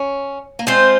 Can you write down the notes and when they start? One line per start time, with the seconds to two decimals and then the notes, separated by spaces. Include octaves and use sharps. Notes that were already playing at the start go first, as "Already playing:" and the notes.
Already playing: C#4
0.59 A#3
0.67 G#3 C4 F4 C5